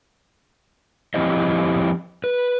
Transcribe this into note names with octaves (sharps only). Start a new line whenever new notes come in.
F3 C4 E4 G4 C5 D#5
B4